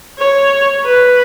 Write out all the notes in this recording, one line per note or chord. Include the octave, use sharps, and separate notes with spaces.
C#5
B4